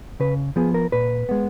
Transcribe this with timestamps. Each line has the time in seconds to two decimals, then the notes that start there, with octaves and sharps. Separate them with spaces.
0.20 C#3 B4
0.56 F3 B3 G#4
0.74 A#4
0.92 A#2 B4
1.29 G#3 B3